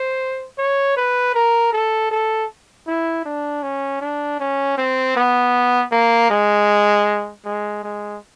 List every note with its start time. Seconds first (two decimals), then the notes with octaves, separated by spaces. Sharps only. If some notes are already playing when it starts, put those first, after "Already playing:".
Already playing: C5
0.58 C#5
0.96 B4
1.34 A#4
1.73 A4
2.11 A4
2.87 E4
3.25 D4
3.63 C#4
4.01 D4
4.39 C#4
4.77 C4
5.16 B3
5.91 A#3
6.30 G#3
7.45 G#3
7.83 G#3